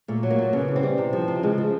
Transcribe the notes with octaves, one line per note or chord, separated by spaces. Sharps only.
A#2 A3
F#3
A#3
A#2
C#3 B3
E3
C4
G3
C3
F3
C3
C#3 G#3
F3